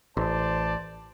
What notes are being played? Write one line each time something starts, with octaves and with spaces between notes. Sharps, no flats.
A1 C5 D5 A5